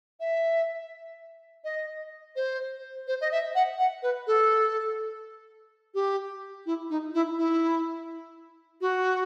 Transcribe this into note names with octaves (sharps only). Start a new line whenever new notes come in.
E5
D#5
C5
C5
D#5
E5
F#5
F#5
B4
A4
G4
E4
D#4
E4
E4
F#4